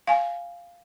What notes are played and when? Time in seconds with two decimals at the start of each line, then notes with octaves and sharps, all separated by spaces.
0.07 F5 G#5